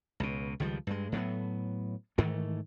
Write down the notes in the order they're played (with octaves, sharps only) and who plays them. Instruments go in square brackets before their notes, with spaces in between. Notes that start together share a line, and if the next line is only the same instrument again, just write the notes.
[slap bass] C#2 B2
C#2 D#3 F3 G3
G2 G#3
A2 F#3 A#3 B3
G#2 D#3 E3 A3